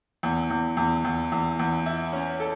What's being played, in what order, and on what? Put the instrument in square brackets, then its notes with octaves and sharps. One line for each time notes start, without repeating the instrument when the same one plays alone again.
[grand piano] E2
E2
E2
E2
E2
E2
E4
C#4
A4